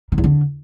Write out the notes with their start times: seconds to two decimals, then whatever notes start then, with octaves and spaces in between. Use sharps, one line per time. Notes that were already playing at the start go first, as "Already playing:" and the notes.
0.12 D#3
0.18 E2
0.24 D3